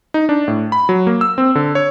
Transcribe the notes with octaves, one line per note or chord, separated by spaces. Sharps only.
D#4
D4
A2
B5
F#3
A#3
E6
C4
D3
C#5